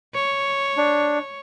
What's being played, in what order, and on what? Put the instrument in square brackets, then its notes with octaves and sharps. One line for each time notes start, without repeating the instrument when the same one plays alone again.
[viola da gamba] C#5
[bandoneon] D4